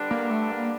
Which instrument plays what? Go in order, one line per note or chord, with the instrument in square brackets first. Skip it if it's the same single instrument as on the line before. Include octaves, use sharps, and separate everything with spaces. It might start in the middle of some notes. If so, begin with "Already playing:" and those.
Already playing: [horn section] D3 G3 B3 D4
[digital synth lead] A#3
A3
A#3